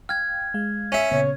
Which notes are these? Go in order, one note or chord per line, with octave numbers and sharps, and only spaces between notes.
F5 G5 F6 G#6
G#3 F5
C#4 E5
A#2 C#3 B3 C#5